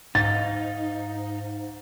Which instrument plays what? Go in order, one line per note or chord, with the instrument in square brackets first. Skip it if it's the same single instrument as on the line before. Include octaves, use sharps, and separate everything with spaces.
[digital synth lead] G#2 [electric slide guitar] D#4 [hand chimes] F5 [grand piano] A6